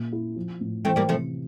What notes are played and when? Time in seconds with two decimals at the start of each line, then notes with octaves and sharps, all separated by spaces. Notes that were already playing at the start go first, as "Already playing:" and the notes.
Already playing: A#2
0.12 E4
0.36 F3
0.61 A2
0.85 E3 A3 C4
0.96 G3 A#3
1.09 C3 F3 A3